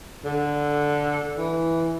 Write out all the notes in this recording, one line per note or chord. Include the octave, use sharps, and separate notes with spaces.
D3
E3